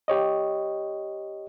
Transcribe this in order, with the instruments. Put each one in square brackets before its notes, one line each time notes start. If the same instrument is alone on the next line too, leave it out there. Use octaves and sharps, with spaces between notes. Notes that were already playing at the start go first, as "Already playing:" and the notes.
[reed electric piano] G4 C#5 D#5